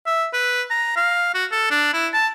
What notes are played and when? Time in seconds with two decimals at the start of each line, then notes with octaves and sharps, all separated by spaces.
0.06 E5
0.33 B4
0.70 A#5
0.97 F5
1.34 F#4
1.52 A4
1.71 D4
1.93 E4
2.14 A5